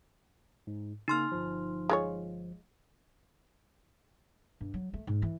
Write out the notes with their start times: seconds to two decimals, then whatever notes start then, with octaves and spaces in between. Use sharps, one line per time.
0.67 G#2
1.08 C#3 A#3 D#4 C6 F6
1.32 G1 F3
1.89 G#3 F4 C#5
4.61 G2
4.74 F#3
4.94 A3
5.07 G#2
5.22 E3